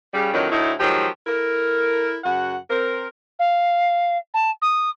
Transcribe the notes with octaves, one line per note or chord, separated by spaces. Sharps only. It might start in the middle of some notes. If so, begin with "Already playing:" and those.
C#3 G3
F2 A2 D#3 F#3 D4 C#5
D2 A2 D#4 E4
D#3 F3 F#3 G#3 G4
E4 A4 A#4
F#2 C#3 F#4 F#5
C4 A#4
F5
A5
D#6